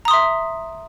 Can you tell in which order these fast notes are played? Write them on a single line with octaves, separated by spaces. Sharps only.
A#5 D#6 C6 E5